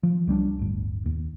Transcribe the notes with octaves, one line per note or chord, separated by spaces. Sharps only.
F3
C2 G3 A#3 D4
D1 G1
D#2